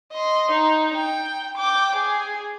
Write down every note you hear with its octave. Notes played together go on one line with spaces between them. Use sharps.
D#5 C6
D#4
G5
G5 D6
G#4